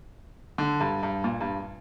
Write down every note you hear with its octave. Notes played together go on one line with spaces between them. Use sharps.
D3
G2
G2
A#2
G2